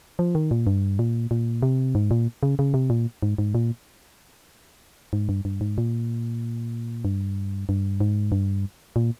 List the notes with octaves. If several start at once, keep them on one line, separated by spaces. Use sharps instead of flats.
F3
D#3
A#2
G2
A#2
A#2
C3
G#2
A#2
C#3
C#3
C3
A#2
G#2
G#2
A#2
G#2
G2
G2
G#2
A#2
G2
G2
G#2
G2
A#2